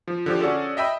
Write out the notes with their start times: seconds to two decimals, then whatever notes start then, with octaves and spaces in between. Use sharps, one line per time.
0.08 F3
0.26 D3 F3 G4
0.41 C#4 F#4 G#4 A4 D5
0.77 D#5 E5 G5 B5